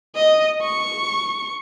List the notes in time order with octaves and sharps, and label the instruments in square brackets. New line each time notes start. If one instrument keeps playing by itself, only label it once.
[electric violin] D#5
C#6